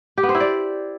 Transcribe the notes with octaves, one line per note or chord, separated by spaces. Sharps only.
G4
B3
C5
E4
D5